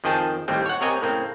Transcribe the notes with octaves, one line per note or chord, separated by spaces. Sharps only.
F2 D#3 F3 G#4 G5 A5
D#2 A2 G3 C4
C#5 F#5
C3 C4 A#4 C#5 D#5 G#5
A2 C#3 A#3 C4